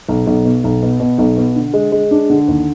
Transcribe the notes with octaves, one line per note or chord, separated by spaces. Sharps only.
B1
B1
B2
B1
B2
B2
B1
B2
D3
G#3
G#3
D4
D3
D#2